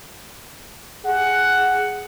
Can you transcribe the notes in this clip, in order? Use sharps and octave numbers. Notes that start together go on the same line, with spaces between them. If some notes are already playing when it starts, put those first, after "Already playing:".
G#4 F#5